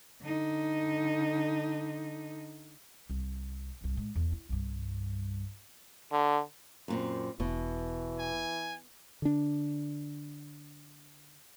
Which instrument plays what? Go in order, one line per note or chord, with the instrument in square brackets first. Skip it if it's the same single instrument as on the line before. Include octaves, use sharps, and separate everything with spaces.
[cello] D3 D#4
[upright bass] C2
C2 G2
A2 G#3
E2
E4
C2 G2
[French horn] D3
[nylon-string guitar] F#2 A#2 C4
[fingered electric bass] E1 [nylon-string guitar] B2 [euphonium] E3
[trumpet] G#5
[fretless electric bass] D3 D4